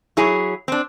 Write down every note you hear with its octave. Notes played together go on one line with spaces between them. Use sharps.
F#3 E4 G#4 C#5
C4 D4